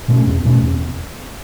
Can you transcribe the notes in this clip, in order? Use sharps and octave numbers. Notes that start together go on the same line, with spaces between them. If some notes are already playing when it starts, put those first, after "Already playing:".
B2 A3 C#4
E2
B2 A3 C#4
E2